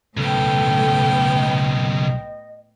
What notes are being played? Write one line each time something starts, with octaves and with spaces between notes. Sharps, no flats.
B1 A2 C#3 B3 A4 G5
D#5